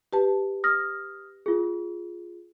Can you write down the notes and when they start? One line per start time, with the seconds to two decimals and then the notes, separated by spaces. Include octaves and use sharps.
0.13 G4 B4 A5
0.64 D#6 F6 A#6
1.46 F4 G#4